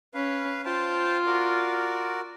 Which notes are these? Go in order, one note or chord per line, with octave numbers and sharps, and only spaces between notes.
C#4 B4 F5
F4 C5 G5 A5
F#4 A#4 D5